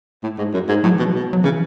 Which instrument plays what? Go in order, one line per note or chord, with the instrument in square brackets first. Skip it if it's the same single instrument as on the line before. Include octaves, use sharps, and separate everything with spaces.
[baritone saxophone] A2
G#2
F#2
G#2
[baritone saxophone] A2 [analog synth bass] F#3
[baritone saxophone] B2 [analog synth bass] E3
[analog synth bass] F#3
[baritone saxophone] B2
[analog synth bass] F#3
[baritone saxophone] C#3 [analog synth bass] E3